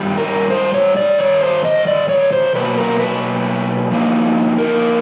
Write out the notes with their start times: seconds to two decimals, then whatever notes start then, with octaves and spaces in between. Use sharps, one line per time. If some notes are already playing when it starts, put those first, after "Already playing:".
Already playing: G2 D#3 G3
0.18 A#4
0.50 C5
0.74 C#5
0.97 D5
1.18 G2 D#3 C#5
1.41 C5
1.65 D#5
1.87 D5
2.09 C#5
2.33 C5
2.54 B2 F#3 A#3 B4
2.77 A#4
2.99 B4
3.91 D3 F3 A#3 D#4
4.59 A#4